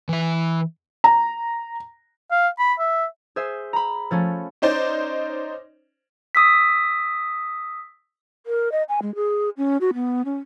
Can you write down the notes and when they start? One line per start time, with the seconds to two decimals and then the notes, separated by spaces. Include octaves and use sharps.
0.09 E3 E5
1.04 A#5
2.31 F5
2.59 B5
2.79 E5
3.36 G#4 C5 E5
3.73 A#5 B5
4.11 F3 A3 C#4
4.62 C#4 D#4 C5 D5
6.35 D#6 E6 B6
8.46 A#4
8.72 D#5
8.89 G#5
9.02 G#3
9.15 G#4
9.57 C#4
9.81 F#4
9.94 B3
10.25 C#4